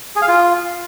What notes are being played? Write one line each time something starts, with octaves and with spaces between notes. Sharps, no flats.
G#4
F5
F4